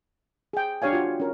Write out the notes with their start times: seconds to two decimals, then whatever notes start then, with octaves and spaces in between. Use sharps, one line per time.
0.53 G#4 G5
0.82 D4 G4 C#5 F5 G#5
0.93 F4 F#4
1.20 C#4 A#4